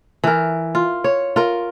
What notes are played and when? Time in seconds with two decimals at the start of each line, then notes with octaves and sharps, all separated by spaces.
0.24 E3 A#4
0.75 F4
1.04 C#5
1.36 F4 A#4